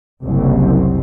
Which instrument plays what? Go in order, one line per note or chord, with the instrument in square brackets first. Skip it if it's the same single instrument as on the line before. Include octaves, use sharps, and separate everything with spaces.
[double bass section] F#1 C2 C4